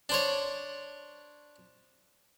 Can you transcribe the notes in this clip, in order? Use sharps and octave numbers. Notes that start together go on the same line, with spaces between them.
D4 C5 C#5